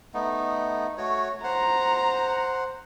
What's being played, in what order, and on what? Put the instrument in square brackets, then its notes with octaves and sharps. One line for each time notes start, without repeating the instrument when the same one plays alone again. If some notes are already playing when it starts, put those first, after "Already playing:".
[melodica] A3 B3 D#4
A3 F#4 C#5
[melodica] C5 F#5 [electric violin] A#5